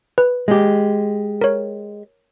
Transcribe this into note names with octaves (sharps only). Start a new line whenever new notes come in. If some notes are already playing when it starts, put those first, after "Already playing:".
B4
G#3 G4
A#4 C#5